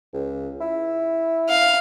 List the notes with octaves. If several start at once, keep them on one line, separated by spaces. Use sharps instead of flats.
C#2
E4
F5